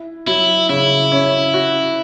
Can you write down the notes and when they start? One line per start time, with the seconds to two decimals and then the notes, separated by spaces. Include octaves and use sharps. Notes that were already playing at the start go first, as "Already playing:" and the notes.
Already playing: E4
0.27 F#3 E4
0.69 C#3 E4
1.12 C#4
1.54 F#4